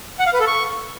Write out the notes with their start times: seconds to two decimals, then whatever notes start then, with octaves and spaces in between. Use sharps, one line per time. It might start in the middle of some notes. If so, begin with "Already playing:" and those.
0.19 F#5
0.26 F5
0.33 B4
0.40 A4
0.47 C#6